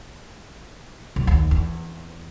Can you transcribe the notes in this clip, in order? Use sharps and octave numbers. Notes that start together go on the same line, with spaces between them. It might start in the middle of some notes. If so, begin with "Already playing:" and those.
B1
D#2
E2